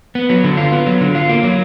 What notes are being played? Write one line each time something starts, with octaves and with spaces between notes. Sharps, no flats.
B3
F#3
D3
F4
B3
F#3
D3
F4
A#3
F#3